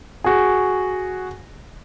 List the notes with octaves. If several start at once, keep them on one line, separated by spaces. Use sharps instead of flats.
F#4 G#4